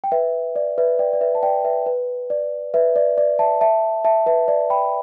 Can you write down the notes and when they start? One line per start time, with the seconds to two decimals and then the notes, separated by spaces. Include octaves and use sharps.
0.04 G5
0.12 B4 E5
0.56 D5
0.78 B4 E5
0.99 D5 G5
1.13 D5
1.21 B4 E5
1.35 A5
1.43 D5 G5
1.65 B4 E5
1.86 B4
2.30 D5
2.74 B4 E5
2.96 D5
3.18 D5
3.39 E5 A5
3.61 E5 A5
4.05 E5 A5
4.26 B4 E5
4.48 D5
4.70 G5 B5